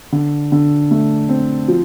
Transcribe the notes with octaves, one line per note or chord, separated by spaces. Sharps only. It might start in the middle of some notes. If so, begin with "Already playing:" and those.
D3
D3
A3
C4
F3